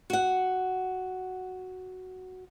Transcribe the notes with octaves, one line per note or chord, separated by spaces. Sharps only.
F#4 F#5